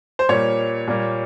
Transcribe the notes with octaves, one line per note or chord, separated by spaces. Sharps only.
C5
A#2 G3 A#3 C#5
A#2 G3 A#3